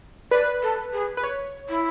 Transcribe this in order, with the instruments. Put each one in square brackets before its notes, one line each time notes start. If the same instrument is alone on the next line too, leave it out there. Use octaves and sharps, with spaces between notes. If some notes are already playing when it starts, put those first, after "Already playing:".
[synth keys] B4 [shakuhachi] D5
[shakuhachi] A4
G#4
[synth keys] B4
C#5
[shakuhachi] E4